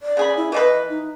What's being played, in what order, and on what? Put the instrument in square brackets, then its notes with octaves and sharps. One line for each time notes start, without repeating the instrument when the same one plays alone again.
[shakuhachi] D5
[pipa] C#3 G#4 B5
[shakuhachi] E4
[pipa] E3 F3 B4 [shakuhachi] D#5
[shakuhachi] D#4